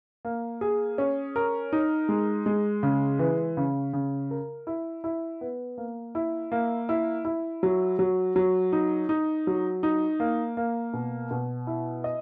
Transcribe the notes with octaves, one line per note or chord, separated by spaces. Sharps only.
A#3
G#4
C#4
A#4
D#4
G#3
G#3
C#3
E3
C#3
C#3
A#4
E4
E4
B3
A#3
E4
A#3
E4
E4
F#3
F#3
F#3
D#4
D#4
F#3
D#4
A#3
A#3
B2
B2
E4
D#5